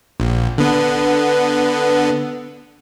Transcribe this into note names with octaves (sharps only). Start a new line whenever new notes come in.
A#1
D3 B3